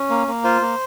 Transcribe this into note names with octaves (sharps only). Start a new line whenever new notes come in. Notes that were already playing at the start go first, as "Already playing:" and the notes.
Already playing: C#4
A#3
A#3
F4 C5
A#3